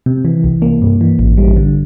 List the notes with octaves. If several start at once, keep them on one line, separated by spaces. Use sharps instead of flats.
C3
E3
C2
A#3
G2
E3
A1
G3
D3